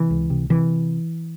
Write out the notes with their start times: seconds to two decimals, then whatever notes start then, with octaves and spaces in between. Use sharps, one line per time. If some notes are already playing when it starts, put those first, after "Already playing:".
Already playing: C3 E3
0.10 C#2
0.30 C3
0.50 C3 E3